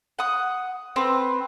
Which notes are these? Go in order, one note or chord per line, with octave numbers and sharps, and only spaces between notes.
F#5 D#6
C4 B4